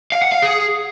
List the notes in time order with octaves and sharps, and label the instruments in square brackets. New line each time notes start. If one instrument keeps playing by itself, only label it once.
[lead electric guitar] F5
F#5
F5
G#4